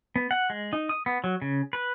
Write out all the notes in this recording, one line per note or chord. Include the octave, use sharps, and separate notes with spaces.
B3
F#5
G#3
D#4
D#6
B3
F#3
C#3
B4